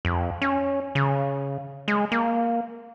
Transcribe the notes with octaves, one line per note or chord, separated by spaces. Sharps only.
F2
C#4
C#3
G#3
A#3